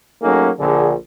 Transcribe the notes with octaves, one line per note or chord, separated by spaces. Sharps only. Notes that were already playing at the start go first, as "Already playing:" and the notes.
F#3 A3 A#3 C#4 D#4 G#4
A#1 D3 G#4